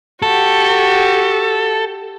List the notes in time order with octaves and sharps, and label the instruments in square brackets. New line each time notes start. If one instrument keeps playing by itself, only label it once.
[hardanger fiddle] F#4 G4 [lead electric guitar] A4